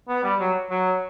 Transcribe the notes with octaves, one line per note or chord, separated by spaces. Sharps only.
B3
G3
F#3
F#3